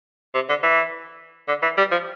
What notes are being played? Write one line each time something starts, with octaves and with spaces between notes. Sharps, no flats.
C3
D3
E3
D3
E3
G3
F3